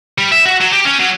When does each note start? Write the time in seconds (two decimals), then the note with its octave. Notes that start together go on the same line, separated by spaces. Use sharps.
0.18 G3
0.32 E5
0.45 F#4
0.61 F#3
0.73 G4
0.85 C#4
1.00 F#3